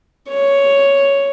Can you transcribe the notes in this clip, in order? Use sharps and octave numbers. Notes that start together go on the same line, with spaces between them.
C#5